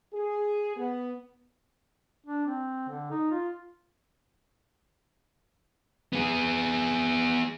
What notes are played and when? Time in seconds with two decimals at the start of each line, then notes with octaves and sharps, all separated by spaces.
0.13 G#4
0.76 B3
2.26 D4
2.46 C4
2.88 D3
3.11 D#4
3.31 F4
6.13 B3 G#4